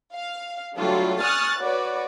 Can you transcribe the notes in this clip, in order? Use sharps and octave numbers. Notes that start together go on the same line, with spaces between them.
F5
D3 F#3 G3 A3 F4 A4
G#5 C#6 D#6 F6 F#6 A6
F#4 B4 C#5 D5